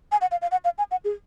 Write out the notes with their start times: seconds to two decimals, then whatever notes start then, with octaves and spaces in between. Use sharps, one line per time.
0.12 G#5
0.21 F#5
0.31 F5
0.42 F5
0.51 F#5
0.65 F5
0.78 G#5
0.91 F#5
1.04 G#4